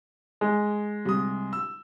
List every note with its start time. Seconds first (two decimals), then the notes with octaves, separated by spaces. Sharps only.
0.41 G#3
1.05 C2 D#6
1.53 E6